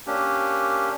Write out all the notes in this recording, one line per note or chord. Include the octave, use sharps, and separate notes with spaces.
A#3 C#4 D4 G4